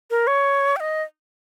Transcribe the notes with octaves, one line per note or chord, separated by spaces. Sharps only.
A#4
C#5
G5
D#5